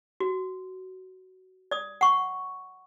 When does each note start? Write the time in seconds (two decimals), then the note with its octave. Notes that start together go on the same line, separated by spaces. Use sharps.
0.20 F#4
1.71 D5 D#6
2.01 F#5 C#6